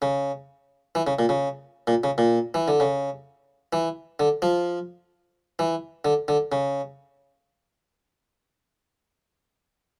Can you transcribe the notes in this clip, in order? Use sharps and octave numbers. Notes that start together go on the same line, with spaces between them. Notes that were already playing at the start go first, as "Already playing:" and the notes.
C#3
E3
C#3
A#2
C#3
A#2
C#3
A#2
E3
D3
C#3
E3
D3
F3
E3
D3
D3
C#3